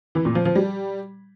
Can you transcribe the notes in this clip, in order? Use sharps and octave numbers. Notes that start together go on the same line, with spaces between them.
E3
A#2
F3
F3
G3